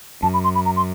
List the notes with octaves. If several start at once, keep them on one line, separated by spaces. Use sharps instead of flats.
F#2 A5
B5
C6
B5
A#5
C6